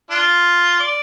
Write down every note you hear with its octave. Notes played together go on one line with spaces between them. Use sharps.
D4 F4
D5